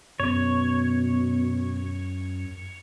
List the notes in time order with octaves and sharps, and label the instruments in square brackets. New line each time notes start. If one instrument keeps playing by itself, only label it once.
[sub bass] F#2 [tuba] B2 [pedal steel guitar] C#5